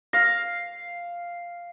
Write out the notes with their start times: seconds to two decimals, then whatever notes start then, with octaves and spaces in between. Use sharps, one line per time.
0.13 F5 A#6